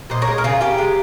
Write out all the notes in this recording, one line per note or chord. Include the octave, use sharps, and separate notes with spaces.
A#2 C5 D#5
A#4 C#5
G#3
A#4
C#3 F4 G#4
C#3 G4 A#4
G#3